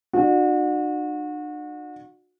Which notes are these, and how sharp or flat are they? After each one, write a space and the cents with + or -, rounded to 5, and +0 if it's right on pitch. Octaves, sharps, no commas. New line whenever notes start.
D4 +40 F#4 -30